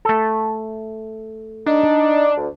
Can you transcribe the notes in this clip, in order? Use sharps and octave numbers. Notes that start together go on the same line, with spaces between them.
A3 A4
D4 D#4
D2